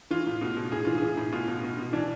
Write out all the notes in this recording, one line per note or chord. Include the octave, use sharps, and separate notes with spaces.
E3 F4
A2
B2
B2
A2 G#4
E3 F4
E3 G#4
A2
B2 F4
B2
B2
B2
E3 D4